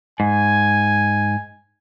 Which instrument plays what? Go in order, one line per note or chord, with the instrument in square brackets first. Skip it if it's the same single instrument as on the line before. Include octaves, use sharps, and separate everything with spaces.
[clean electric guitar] G#2 [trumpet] G#5